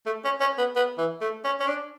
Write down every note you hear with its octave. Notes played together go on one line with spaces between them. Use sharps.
A3
C#4
C#4
B3
B3
E3
A3
C#4
C#4
D4